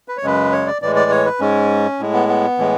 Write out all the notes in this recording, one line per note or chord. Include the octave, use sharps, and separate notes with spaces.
B4
C#5
F#2 C#3 G#3 B4
C#5
D5
A2 E3 G#3 D5
D5
C#5
B4
G#2 G#3 C#4
A2 G#3
B3
B3
A2 E3 G#3